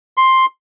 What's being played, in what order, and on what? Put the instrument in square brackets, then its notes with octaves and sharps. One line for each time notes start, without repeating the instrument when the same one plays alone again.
[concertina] C6